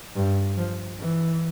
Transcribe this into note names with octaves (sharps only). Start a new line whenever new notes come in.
G2
F3
E3